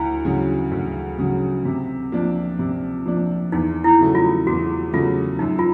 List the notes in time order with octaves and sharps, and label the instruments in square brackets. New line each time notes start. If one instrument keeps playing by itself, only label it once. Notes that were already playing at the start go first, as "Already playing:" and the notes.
Already playing: [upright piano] D2 [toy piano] E4
[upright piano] C#3 F#3
D2
C#3 F#3
C3
F3 A#3 D4
C3
F3 A#3 D4
[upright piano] E2 [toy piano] D#4
[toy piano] E4
[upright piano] C#3 F#3 A3
[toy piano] F4
[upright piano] E2 [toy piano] F#4
[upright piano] C#3 F#3 A3 [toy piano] F4
[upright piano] F#2 [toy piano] D#4
[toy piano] F4